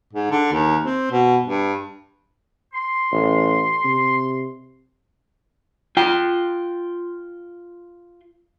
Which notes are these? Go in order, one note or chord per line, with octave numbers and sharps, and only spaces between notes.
G#2
D3
D#2
C4
B2
G2
C6
A1
C3
F4 G5